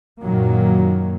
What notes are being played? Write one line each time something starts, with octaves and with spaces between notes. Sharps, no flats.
F#2 A#2 D#3 F#3 A#3